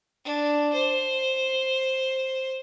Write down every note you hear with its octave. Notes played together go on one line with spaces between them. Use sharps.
D4
C5